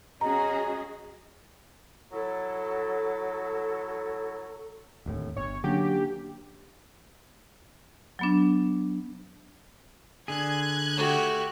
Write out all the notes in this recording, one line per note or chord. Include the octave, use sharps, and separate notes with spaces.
C#4 F#4 G#4 D#5 A#5
F#3 E4 A4
D1 D#2 A2
G1 C#5
D3 F#3 A#3 C#4 G4
F#3 B3 D4
D3 G#4 F#6 G#6
A3 F#4 G4